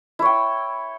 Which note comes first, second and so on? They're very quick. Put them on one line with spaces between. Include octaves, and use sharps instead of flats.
E4 C#5 G5